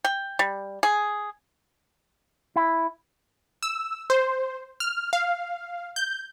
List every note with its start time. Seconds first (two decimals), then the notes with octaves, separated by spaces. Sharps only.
0.04 G5
0.39 G3
0.83 G#4
2.56 E4
3.63 E6
4.10 C5
4.80 F6
5.13 F5
5.96 G6